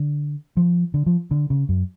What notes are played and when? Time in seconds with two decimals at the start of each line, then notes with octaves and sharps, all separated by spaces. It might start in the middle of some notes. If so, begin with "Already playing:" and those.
Already playing: D3
0.57 F3
0.94 D3
1.06 F3
1.31 D3
1.50 C#3
1.69 F#2